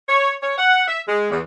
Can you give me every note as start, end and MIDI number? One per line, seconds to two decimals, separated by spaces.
0.08 0.33 73
0.42 0.56 73
0.58 0.87 78
0.87 1.00 76
1.07 1.29 56
1.31 1.39 40